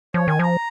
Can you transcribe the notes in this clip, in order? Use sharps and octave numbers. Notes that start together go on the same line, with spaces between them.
F3 C#5
D#3 G#5
F3 A#5